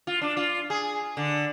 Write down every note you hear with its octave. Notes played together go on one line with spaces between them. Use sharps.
F4
D4
F4
G#4
D3